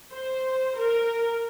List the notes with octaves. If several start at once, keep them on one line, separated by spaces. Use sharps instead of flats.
C5
A#4